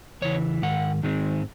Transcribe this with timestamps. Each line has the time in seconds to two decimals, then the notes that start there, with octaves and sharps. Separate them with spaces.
0.22 E2 C#3 E3 C#5
0.62 G#2 D#3 F#5
1.03 G#2 D#3 G#3 C4